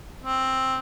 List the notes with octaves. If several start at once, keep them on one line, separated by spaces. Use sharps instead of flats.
C4